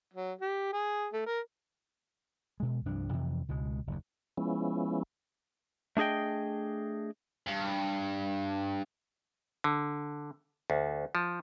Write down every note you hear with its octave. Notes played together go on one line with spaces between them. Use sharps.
F#3
G4
G#4
A3
A#4
B2 G#3
C2 G2 F3 D4
F2 C3 E3
C#2 B2 G#3
F#1 D#2
F3 G#3 B3 C#4 E4
A3 D4 G#4 D#5 G5
G2
D3
D2
F3